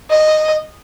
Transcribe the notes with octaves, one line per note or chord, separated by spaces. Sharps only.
D#5